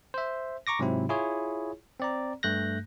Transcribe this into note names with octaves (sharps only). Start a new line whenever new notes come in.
C5 E5
A#5 C#6 D6 A#6
G#2 C3 F#3 C4 E4
E4 F4 G#4 C#5
C4 D5 A#5
G2 A3 F#6 G6 A#6